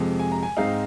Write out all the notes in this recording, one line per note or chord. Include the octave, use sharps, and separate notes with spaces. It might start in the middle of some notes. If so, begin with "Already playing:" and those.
Already playing: F2 C3 F3 G#3
G#5
A#5
G#5
G#2 G#3 C4 D#4 F5